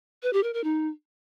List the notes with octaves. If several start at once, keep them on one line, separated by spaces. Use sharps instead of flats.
B4
G4
A#4
A#4
D#4